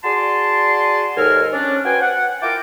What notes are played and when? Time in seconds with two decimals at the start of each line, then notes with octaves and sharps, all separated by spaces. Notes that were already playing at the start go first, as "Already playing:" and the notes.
0.04 F#4 G#4 D5 A5 C6
1.17 D#2 G#2 A4 A#4 G#5 F6
1.52 C#4 D4
1.84 F#4 B4 C5 G5 G#5
2.01 F#5
2.41 E4 F4 A#4 G5 A5 D6